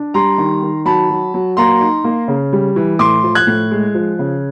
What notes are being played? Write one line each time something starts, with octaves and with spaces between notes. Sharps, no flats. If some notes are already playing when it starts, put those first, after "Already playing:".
Already playing: D4
G3 A#5 C6
D#3
D#3
F#3 A5 B5
F#3
F#3
A#3 A#5 C6
D#4
A#3
C#3
G3
E3
A2 C6 D6
F3
F#6 G#6
A2
G#3
F3
C#3